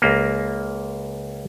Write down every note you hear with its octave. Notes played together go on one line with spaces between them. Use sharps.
C#2 A#3